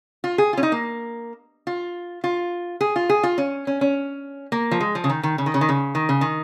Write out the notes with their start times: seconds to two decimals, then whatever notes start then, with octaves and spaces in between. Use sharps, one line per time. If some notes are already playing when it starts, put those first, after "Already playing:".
0.24 F4
0.38 G#4
0.53 F4
0.57 C#4
0.63 D#4
0.72 A#3
1.67 F4
2.24 F4
2.81 G#4
2.96 F4
3.09 G#4
3.23 F4
3.38 C#4
3.67 C#4
3.81 C#4
4.52 A#3
4.71 F3
4.81 G#3
4.95 F3
5.04 C#3
5.10 D#3
5.23 D#3
5.38 C#3
5.46 D#3
5.54 C#3
5.61 D#3
5.69 C#3
5.95 D#3
6.09 C#3
6.21 D#3